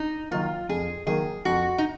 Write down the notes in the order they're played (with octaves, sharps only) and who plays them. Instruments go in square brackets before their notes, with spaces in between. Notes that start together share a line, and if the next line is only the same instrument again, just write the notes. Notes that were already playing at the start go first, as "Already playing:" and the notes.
Already playing: [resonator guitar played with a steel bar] D#4
[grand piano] D#3 F#3 A#3 [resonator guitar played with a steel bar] F4
[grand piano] F2 [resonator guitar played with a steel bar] G#4
[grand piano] D#3 F#3 A#3 [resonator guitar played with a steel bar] G#4
[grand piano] F2 [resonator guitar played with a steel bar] F#4
[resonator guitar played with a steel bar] D#4